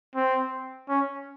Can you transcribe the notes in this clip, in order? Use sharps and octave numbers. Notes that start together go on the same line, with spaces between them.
C4
C#4